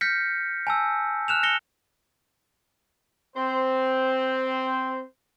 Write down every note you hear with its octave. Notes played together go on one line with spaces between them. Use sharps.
F6 G6 A#6 B6 C#7
G#5 A5 E6
F6 F#6 E7 F7
A#6 C#7 G7
C4 C5